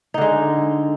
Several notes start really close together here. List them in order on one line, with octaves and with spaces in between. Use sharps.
D#4 D3 G#3